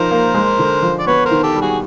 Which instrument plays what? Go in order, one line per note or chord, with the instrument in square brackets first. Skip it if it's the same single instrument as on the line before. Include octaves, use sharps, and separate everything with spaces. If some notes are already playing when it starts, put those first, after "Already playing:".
Already playing: [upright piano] F3 D#4 [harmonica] A#4 C5
[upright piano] A#3
G#3
D3
F3
[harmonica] D5
[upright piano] B3 [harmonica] B4 C#5
[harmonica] A#4 C5
[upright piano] D#3
[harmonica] G4 A4
[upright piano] G3
[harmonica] F#4 G#4